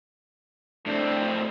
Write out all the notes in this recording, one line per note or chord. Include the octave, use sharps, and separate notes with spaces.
A2 C4 D4